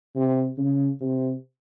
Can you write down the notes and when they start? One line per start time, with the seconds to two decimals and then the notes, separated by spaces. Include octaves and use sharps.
0.15 C3
0.58 C#3
1.01 C3